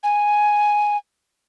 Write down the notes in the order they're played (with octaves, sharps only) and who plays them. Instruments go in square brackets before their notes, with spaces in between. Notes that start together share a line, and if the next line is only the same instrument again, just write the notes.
[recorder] G#5